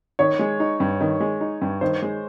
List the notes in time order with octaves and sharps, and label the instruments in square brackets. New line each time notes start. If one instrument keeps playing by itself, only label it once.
[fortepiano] D#3 [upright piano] C#5
[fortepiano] G#3
D#4
G2
D#3
G#3
D#4
G2
[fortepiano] D#3 [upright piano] C5
[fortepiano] G#3